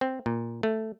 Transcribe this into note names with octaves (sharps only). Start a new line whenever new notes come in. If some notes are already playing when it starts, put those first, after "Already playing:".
C4
A#2
A3